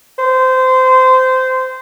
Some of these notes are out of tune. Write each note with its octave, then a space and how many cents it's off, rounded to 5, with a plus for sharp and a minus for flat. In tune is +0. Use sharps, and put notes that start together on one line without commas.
C5 -20